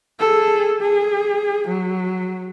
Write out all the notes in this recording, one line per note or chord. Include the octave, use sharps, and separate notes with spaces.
G#4 A4
G#4
F#3